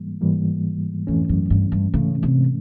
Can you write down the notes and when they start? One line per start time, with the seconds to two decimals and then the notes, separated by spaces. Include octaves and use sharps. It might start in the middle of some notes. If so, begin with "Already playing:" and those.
Already playing: G#2 E3 G3 A#3
0.21 G#2 E3 G3 A#3
1.07 F2 G#2 E3 A3 C#4
1.29 F#2
1.50 G2
1.72 G2
1.94 G#2 C#3 E3 A3 C#4
2.23 C3